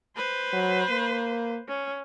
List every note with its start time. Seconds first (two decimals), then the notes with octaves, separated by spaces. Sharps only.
0.17 B4 C5
0.53 F#3
0.90 A#3
1.68 C#4